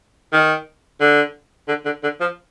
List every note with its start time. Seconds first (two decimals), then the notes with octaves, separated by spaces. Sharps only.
0.33 D#3
1.01 D3
1.68 D3
1.85 D3
2.03 D3
2.20 F3